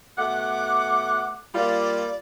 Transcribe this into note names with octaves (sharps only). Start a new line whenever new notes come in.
B2 A3 F#5 D6
G3 A#3 F4 D5